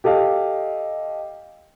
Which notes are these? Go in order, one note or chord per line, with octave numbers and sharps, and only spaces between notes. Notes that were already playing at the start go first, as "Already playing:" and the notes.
G4 A4 D#5 F5